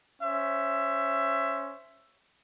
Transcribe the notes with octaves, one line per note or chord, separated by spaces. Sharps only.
C#4 C5 E5